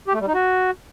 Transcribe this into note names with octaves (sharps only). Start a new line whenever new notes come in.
G4
A3
G3
D#4
F#4